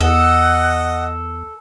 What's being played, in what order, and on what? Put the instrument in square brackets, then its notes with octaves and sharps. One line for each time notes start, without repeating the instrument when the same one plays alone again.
[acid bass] E2 [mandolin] A4 [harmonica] D#5 [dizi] F#5